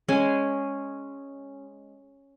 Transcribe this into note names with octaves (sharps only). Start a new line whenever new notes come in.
G#3 C#4 G#5